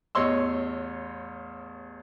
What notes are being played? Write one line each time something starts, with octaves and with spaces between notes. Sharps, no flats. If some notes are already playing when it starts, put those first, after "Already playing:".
A1 E2 C#5 D#5 C6 E6